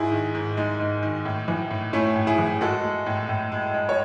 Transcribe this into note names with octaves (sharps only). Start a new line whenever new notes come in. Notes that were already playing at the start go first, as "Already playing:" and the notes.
Already playing: G#2 E4 G#4
D#3
G#2
G#3 D#4
G#2
D#3
A2
E3
A2
A3 C#4 E4
A2
E4 G#4
E3
G#3 F#4 A4
G#3
A2
A2
G#3
G#3
C#5